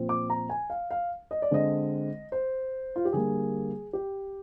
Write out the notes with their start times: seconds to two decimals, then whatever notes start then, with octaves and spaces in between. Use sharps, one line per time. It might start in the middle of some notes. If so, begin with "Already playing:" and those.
Already playing: A#2 F3 C4
0.09 D6
0.30 A#5
0.50 G#5
0.70 F5
0.91 F5
1.31 D#5
1.42 D5
1.51 D3 G#3 C4 D#5
2.32 C5
2.96 F4
3.05 G4
3.13 D3 G3 A#3 G#4
3.93 G4